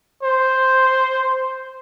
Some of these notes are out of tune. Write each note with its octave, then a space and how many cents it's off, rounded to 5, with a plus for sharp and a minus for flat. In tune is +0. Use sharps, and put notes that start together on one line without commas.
C5 +0